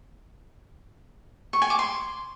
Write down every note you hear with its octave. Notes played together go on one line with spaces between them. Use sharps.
C#6
G#5
D6
C6